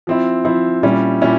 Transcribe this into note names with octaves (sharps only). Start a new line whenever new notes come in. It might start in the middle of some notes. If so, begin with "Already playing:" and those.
F3 C4 E4
F3 C4 E4
A#2 G3 C#4 E4
A#2 G3 C#4 E4